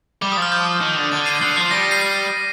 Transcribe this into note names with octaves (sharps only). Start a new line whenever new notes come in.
G3 D6
D#6
F3
F6
G6
D#3
D3
D3 A6
C7 D#7
D3 C7
F3 C7
G3 A#6
C7 D#7
C7